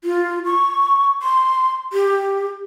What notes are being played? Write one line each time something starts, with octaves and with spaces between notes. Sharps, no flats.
F4
C#6
C6
G4